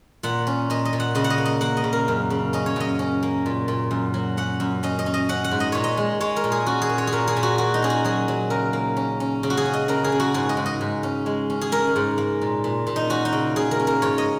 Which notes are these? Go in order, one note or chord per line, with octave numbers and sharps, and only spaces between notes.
A#2 F#5
C#4
A#2 D#5
D#5
A#2
F#5
C#3 D#5
F#5
D#5
A#3
D#5
A#3 F#5
D#5
C#3
A#4
F#2
C#3
C#4 D#5
C#5
F#2 D#5
C#4
A#3
A#2
A#2
F#2
F#3
C#4 F#5
F#2
C#4 D#5
D#5
C#4
D#5
C#4 F#5
F#5
G#2
D#5
A#2 C#5
D#5
G#3
G#3 C#5
A#4
A#2
G#4
C#4 F#4
G#4
A#2
C#5
G#4
A#2 A#4
G#4
A#2
F#4
A#3 F#4
D#4
C#4 G#4
F#4
F#3 G#4
F#3
C#3 A#4
A#3
C#4
C#4
C#3
F#4
G#4
C#4
D#5
C#3 A#4
G#4
C#3
F#4
G#2 G#4
D#5
G#2
D#5
G#2
C#4
G#3
C#4
G#4
C#4 A#4
G#2
A#3
A#2
A#2
A#2
D#4
C#4 F#4
D#4
C#3
C#3 G#4
A#4
C#4
A#4
G#2 C#5
D#5